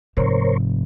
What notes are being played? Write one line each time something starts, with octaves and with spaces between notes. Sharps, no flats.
F1 G#2 A#4 C5 C#5